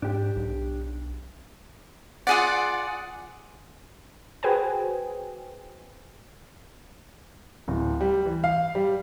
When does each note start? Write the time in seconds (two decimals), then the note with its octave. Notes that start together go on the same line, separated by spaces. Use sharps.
0.02 G#2 D4 G4
0.36 B1
2.27 F4 G#4 D5 F#5
4.43 F#4 G#4 B4 C5 G5 G#5
7.68 D1
8.01 G3
8.25 E3
8.44 F5
8.75 G3